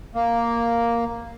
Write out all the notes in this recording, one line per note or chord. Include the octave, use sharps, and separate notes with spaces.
A#3